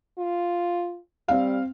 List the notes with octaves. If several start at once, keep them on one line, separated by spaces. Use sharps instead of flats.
F4
G3 C4 F5